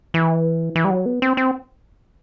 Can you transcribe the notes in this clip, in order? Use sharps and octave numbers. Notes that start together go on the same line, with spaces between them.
E3
E3
G3
F#3
B3
C4
C4